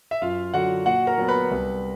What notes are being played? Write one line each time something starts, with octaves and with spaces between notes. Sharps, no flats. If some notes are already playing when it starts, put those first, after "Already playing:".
E5
F#2 F4 F5
D3 F#3 F#4 F#5
A#2 F#4 F#5
A#4 A#5
F#3 B3
B4 B5
C2